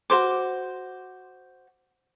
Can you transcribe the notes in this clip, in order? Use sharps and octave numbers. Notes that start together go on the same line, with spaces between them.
F#4 A#4 C5 D6